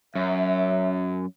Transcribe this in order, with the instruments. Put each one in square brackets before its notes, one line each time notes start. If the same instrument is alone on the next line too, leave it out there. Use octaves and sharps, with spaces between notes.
[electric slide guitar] F#2 [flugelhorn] E5